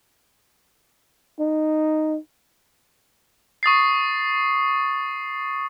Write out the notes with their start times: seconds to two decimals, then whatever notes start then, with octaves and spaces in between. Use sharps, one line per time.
1.40 D#4
3.63 C#6 D#6 A6 C7